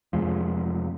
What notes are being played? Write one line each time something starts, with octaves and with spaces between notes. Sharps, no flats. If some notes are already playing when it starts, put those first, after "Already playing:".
F2 C3 F3 G#3